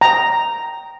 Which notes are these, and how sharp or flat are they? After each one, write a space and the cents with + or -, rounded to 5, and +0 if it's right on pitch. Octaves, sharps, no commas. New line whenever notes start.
G5 -20 A#5 +0